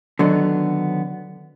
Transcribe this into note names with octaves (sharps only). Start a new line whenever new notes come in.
D3 D#3 F#3 B3